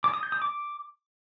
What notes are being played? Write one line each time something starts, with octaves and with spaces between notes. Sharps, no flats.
D6
D#6
G6
D#6
D6